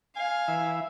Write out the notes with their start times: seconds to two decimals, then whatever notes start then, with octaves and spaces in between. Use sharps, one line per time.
0.16 F5 G#5
0.48 E3 E5